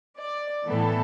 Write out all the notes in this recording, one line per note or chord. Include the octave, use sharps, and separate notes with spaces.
D5
A2 E3 B3 A4